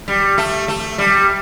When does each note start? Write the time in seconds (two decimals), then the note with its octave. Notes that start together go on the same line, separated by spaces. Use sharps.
0.08 G3
0.38 A3
0.68 A3
0.98 G3